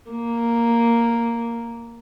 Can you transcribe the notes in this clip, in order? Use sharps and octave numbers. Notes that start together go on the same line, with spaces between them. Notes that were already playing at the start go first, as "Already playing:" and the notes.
A#3